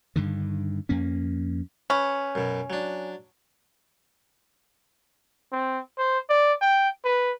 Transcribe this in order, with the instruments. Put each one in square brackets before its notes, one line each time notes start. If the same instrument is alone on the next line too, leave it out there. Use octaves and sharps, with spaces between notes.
[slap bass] G2 D3 D#3
F2 A#3 C#4
[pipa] C#4 [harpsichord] B4
[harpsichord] F#2 B2
F#3 D4
[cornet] C4
C5
D5
G5
B4